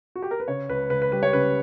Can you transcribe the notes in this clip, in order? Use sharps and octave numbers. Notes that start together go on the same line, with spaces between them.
F#4
G4
A#4
B4
C#3 C#5
C#2 B4
C#2 B4
B4
G3 B4
C#5
C#3 B4